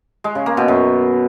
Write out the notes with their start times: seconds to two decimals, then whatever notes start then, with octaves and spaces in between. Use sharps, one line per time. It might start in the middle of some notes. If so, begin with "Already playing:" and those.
0.24 G#3
0.35 C#3
0.46 A#3
0.57 B2
0.68 F#2